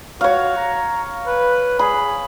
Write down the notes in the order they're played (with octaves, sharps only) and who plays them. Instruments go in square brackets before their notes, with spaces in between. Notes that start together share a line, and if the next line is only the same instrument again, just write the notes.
[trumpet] F#4 [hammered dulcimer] C#5 F5
[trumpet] A#5
B4
[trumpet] G#4 [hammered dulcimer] B5